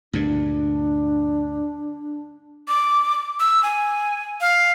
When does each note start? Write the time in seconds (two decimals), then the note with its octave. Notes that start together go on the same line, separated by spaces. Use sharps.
0.13 D2 G2 A#2 D4
2.68 D6
3.40 E6
3.63 G#5
4.41 F5